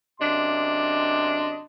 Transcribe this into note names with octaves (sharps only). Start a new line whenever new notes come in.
F#2 C3 D4 D#5 C6